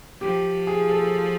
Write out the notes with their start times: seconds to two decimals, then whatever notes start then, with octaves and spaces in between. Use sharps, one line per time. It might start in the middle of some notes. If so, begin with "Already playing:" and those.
0.21 F3 G4
0.67 G#4
0.90 A4